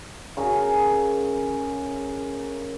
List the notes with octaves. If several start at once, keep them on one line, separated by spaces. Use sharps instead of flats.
C#3 C#4 A#4